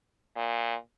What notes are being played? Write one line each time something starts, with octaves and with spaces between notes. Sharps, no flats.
A#2